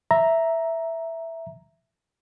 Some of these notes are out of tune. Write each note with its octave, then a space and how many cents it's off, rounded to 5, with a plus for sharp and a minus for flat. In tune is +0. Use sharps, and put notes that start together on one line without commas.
E5 +0 A#5 +0